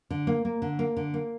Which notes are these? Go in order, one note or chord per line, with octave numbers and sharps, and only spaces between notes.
D3
A#3
A#3
D3
A#3
D3
A#3